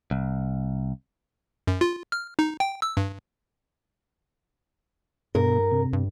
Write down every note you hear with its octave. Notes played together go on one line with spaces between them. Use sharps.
C2
F#2
F4
F6
D#4
G5
E6
G2
G2 B2 A#4
C3
G2